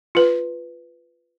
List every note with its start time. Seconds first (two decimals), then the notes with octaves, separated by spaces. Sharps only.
0.15 F4 B4